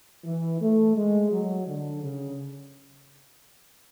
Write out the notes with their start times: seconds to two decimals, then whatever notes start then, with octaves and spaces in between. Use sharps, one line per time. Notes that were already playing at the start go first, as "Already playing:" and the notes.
0.24 E3
0.60 A3
0.96 G#3
1.31 F#3
1.67 D3
2.02 C#3